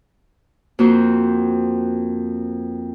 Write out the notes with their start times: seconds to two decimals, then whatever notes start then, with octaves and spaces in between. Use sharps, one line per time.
0.79 F2 A#3 F#4 C5